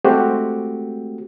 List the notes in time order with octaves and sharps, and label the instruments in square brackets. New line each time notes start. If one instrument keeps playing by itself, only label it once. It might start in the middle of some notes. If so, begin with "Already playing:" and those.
[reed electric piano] G#3 A3 C4 F#4 G4